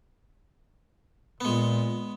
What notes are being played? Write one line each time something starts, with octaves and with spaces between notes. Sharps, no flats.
A#2 G#3 B3